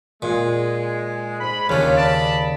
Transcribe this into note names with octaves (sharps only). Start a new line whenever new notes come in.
A#2 G#3
G#2 B5
D#2 C#3 C#4 D4 F4
D5 A5 B5